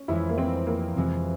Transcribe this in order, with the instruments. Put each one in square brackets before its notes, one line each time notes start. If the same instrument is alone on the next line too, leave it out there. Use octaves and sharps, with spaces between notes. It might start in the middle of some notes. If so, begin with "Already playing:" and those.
Already playing: [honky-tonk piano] C#4
[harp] F2 E3 G#3 [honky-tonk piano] E4
[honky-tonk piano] A#3
C4
A#3
[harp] F2 E3 G#3 [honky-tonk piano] C3